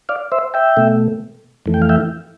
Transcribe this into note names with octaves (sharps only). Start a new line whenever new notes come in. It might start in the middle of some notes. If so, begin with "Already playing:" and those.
D5 F5
C5 E5
E5 G5
B2 A3
F2 E3 A3
G5
F5
E5 G5